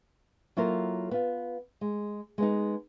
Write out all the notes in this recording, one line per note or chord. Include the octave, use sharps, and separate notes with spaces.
F#3 A#3 E4 F4 A4 A#4
B3 F4
G#3
G#3 B3 D#4